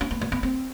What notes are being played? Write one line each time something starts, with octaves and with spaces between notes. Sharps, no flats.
C#4
B3
B3
B3
C4